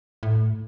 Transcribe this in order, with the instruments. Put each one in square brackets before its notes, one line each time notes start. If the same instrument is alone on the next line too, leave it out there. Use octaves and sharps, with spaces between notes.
[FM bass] A2